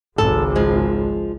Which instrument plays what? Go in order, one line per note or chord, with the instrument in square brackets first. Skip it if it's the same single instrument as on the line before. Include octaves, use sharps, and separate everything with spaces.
[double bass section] G#1 C#2 [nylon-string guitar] A4
[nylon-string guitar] F3 G#3